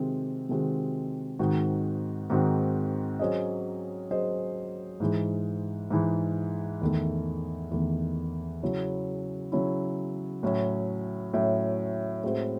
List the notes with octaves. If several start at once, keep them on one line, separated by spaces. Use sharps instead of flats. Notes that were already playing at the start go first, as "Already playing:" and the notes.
Already playing: C3 D#3 G#3 C4 F#4
C3 D#3 G#3 C4 F#4
G#2 D#3 G#3 C4 F#4
G#2 D#3 G#3 C4 F#4
F#3 C#4 G#4 C5 D#5
F#3 C#4 G#4 C5 D#5
G#2 E3 G#3
G#2 E3 G#3
E2 D#3 A3
E2 D#3 A3
C#3 F#3 C#4 E4
C#3 F#3 C#4 E4
A2 F#3 C#4
A2 F#3 C#4
A2 G#3 C4 F#4 C5